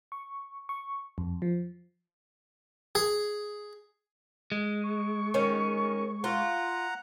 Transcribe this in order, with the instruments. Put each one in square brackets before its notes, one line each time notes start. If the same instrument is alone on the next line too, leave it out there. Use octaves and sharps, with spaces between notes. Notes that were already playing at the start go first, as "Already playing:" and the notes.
[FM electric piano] C#6
C#6
F2
F3
[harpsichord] G#4
[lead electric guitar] G#3
[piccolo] C#6
[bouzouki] D#3 C#4
[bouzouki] F4 [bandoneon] F#5 A#5